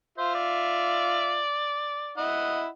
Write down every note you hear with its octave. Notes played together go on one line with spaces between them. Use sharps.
F4 C5 E5
D5
E4 D#5 F#5